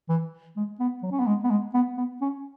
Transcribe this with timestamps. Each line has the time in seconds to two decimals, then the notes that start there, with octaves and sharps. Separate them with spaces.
0.09 E3
0.56 G#3
0.80 B3
1.03 F#3
1.12 C#4
1.20 B3
1.27 G#3
1.44 B3
1.50 G#3
1.74 B3
1.97 B3
2.21 C#4